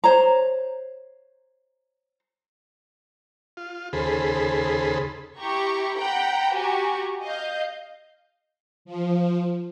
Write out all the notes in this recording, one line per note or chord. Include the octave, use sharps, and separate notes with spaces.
C5 C#5 A#5
F4
D#2 C#3 G#4 A4 C5 B5
E4 G4 A#5 C#6
F#5 G5 A#5 B5
F#4 G4 G#5 A#5 C#6
D#5 F5 G6
F3